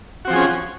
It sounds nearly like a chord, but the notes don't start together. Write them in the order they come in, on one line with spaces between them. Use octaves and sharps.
F#4 C4 F3 G#4 C#4